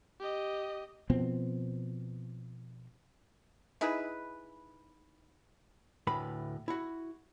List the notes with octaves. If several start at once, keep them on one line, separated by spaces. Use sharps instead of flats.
G4 D#5
B2 F3 B3 C4
D#4 E4 G#4 B4
D2 A2 B4 B5
E4 F#4